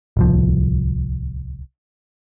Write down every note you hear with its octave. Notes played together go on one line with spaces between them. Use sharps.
D1 C2 F3